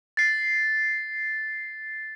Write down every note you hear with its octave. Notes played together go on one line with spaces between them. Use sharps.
A6 C7